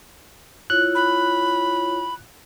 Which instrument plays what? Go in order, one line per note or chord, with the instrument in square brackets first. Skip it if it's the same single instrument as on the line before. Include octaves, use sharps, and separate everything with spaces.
[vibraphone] E4 F4 C#5 [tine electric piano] F#6
[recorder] B5